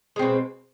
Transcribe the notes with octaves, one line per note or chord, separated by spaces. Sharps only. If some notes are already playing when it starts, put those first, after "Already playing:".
B2 G#3 C4